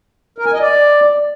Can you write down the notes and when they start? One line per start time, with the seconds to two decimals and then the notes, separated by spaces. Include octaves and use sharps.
0.38 A#4
0.46 G#5
0.53 D#5
0.61 D5